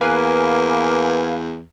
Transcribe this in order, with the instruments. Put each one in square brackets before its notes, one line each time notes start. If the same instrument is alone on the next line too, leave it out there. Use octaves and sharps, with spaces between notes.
[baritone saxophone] E2 [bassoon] A#3 [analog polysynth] B4 F5 G#5